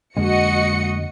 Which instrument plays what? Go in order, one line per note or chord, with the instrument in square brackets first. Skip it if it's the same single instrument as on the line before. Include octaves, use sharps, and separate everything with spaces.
[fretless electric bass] F2 D3 A#3 [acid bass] G#3 [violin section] F#4 D#5 C#7